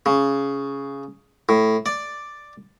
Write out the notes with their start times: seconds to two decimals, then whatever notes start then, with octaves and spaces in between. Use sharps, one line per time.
0.06 C#3
1.49 A2
1.86 D5